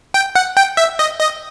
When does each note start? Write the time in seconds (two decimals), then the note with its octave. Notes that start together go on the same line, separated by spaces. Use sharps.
0.14 G5
0.36 F#5
0.57 G5
0.77 E5
0.99 D#5
1.20 D#5